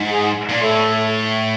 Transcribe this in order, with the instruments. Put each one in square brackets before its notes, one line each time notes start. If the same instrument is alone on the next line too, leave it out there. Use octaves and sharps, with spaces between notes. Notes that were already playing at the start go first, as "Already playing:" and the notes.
Already playing: [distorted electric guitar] G#2
[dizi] G#4
[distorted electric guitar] A#2
[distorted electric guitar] A2 [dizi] A4